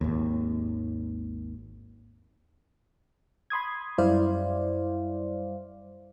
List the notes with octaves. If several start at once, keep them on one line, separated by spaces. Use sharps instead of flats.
G#1 D#2
B5 C6 D#6 G#6
F#2 G3 E4 C5 D5 F5